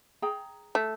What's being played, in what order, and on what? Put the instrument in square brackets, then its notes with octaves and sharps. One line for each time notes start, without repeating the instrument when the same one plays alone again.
[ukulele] G#4 G5 A#5
[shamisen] A3